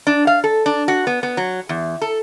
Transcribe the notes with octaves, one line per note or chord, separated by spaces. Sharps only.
D4
F5
A4
D4
F#4
B3
B3
F#3
E2
A4